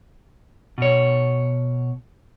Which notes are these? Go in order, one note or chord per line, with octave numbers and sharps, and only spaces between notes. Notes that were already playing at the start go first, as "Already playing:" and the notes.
B2 C#5